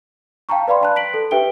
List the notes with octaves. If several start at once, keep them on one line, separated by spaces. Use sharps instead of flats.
F5 G5 A5 A#5 C#6
B4 D5 F5 B5 C6
D5 A5 F#6
B6 D7 F#7
A4
G4 B4 E5 G5 D7 G7